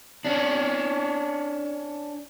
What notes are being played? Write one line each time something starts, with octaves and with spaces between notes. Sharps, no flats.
C#4 D4